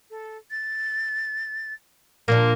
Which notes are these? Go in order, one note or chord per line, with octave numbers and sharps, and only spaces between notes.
A4
A6
A#2 F3 A#3 D4